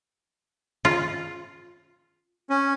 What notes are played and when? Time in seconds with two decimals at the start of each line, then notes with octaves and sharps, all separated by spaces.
0.85 F4
2.50 C#4